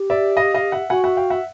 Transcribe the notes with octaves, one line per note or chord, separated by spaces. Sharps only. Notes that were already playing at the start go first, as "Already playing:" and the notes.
Already playing: G4
D5 E5
D#5 F5
D#5 F5
E5 F#5
F#4 F#5 G#5
E5 F#5
F5 G5
E5 F#5